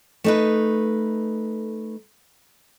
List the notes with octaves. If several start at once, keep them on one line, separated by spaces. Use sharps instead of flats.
A3 D#4 B4